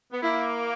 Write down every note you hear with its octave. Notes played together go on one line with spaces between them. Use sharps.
B3
A#3 E4